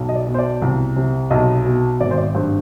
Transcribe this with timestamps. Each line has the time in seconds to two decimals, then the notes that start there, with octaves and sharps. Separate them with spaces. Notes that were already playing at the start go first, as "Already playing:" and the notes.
Already playing: B1
0.09 D#5
0.15 D5
0.27 B2
0.34 C5
0.39 D5
0.62 C2
0.96 C3
1.30 B1 D#5
1.65 B2
2.00 G#1 D5
2.11 C5
2.18 D5
2.35 G2 C5